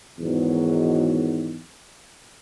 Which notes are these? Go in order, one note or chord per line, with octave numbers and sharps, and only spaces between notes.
E2 G#2 B2 D#3 F#3